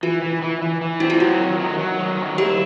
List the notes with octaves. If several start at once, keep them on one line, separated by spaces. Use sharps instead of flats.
E3 F4
E3
E3
E3
E3
C4 E4
F4
F#3 F#4
D#3
F#3
F#3
D#3
F#3
E4 G4